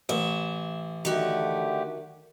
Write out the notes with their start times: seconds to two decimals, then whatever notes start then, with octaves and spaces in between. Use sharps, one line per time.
0.09 A1 E5
1.05 D3 D#3 A3 F#4 G4